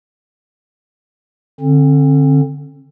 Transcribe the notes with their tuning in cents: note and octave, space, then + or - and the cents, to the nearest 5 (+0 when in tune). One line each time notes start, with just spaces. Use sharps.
D3 +0 C4 +40